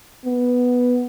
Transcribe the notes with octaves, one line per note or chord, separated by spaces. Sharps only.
B3